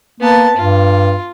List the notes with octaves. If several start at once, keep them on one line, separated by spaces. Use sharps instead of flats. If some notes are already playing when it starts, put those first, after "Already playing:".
A#3 B3 A5
G2 F4